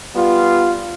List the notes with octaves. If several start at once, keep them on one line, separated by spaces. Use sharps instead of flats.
G3 B3 F4